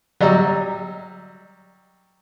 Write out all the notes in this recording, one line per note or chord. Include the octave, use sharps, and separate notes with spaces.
F#3 G3 D#5 A#5 E6